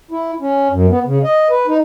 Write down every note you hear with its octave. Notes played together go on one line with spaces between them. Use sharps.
E4
C#4
F#2
B3
C#3
D#5
B4
D#4